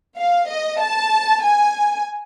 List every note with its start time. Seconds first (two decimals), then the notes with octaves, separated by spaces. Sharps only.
0.17 F5
0.49 D#5
0.81 A5
1.43 G#5